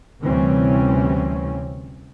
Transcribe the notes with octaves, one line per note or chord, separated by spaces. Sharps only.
D2 C3 E3 G3 C4 C#4